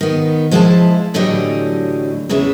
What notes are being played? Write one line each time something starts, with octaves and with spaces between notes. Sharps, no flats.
D#3 B3
F3 G#3 E4 C#5 F5 A5
A2 D3 E3 F#3 G4 D#5
E2 C#3 E3 G#3 E5